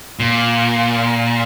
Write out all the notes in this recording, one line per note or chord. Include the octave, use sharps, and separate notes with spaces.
A#2